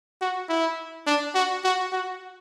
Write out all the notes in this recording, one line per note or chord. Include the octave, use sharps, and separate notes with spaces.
F#4
E4
D4
F#4
F#4
F#4